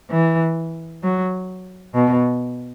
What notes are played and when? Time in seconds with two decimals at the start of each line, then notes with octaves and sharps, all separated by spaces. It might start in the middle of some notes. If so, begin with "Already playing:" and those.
0.11 E3
1.03 F#3
1.95 B2